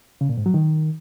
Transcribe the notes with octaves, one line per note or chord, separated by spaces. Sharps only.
C#3
A#2
G#2
F#3
D#3